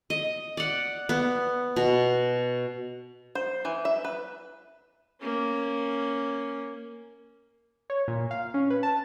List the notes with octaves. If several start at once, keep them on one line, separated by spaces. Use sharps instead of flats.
D#5
D5 F#5
B3
B2
C5
E3
E5
B4
A#3 C#4
C#5
A#2
F5
C#4
B4
A5